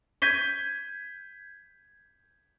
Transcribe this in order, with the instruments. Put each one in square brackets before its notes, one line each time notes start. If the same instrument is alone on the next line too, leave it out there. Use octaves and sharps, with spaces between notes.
[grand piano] G6 G#6 B6 D#7 G7